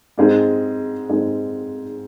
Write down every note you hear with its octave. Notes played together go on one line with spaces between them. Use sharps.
G#2 G#3 C4
G#2 G#3 C4